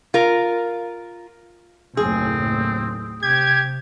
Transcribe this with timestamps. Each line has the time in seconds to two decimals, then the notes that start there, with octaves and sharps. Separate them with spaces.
0.14 F4 A#4
1.97 F#1 D#2 A2 C4 G#4
3.23 C3 G4 G#6